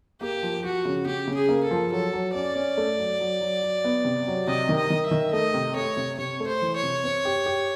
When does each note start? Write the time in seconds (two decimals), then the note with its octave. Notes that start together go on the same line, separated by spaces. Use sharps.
0.21 A#3 G4
0.43 F3
0.64 F3 F#4
0.85 C#3
1.06 C#3 G4
1.28 C#3
1.35 G#4
1.49 A#3
1.64 A4
1.71 F3
1.92 F#3 A4
2.13 F#3
2.35 C#4 D5
2.56 C#4
2.77 A3
2.99 F#3
3.20 F#3
3.41 F#3
3.63 F#3
3.84 B3
4.05 C3
4.27 F#3
4.47 C3 D#5
4.69 D#3
4.76 D#5
4.90 D#3
5.05 E5
5.11 D#3
5.33 A3 D#5
5.54 C3
5.75 A3 C#5
5.97 C3
6.18 C3 C#5
6.40 A3
6.47 C5
6.62 E3
6.76 C#5
6.83 C3
7.04 C4
7.25 G4
7.46 G4